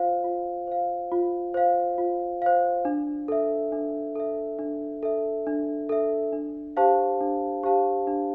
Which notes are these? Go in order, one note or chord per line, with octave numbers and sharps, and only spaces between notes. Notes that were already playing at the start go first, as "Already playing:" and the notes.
Already playing: F4 C5 F5
F4
C5 F5
F4
C5 F5
F4
C5 F5
D4
A4 E5
D4
A4 E5
D4
A4 E5
D4
A4 E5
D4
G4 C5 F5 A5
D4
G4 C5 F5 A5
D4